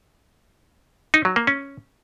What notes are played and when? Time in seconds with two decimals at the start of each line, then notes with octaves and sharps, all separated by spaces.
1.14 D#4
1.25 F#3
1.36 A#3
1.47 C#4